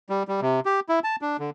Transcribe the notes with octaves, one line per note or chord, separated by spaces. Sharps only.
G3
G3
C3
G4
E4
A5
D4
D3